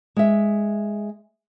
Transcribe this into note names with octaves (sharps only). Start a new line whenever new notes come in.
G#3 E5